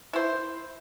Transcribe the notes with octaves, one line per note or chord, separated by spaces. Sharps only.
E4 C5